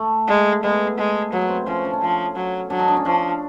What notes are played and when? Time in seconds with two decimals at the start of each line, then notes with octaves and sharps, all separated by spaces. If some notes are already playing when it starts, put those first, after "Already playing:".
Already playing: A3
0.28 G#3
0.63 G#3 B3
0.98 G#3
1.33 F#3 B3
1.49 C4
1.67 F3 C#4
1.85 D4
1.93 C#4
2.02 F3
2.36 F#3
2.70 F#3 D4
2.79 D#4
2.88 D4
2.97 C#4
3.05 F3 D4